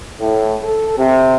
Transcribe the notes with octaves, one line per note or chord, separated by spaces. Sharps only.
A2
A4
C3